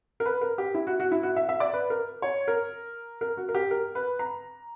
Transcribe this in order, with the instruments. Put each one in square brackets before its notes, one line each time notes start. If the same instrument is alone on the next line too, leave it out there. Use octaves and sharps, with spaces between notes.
[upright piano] A#4
B4
A#4
G4
E4
F#4
F#4
E4
F#4
E5
E5
D5
B4
A#4
C#5
A#4
A#4
F#4
A#4
G4
A#4
B4
A#5